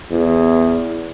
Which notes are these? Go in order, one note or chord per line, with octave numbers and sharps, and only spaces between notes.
E2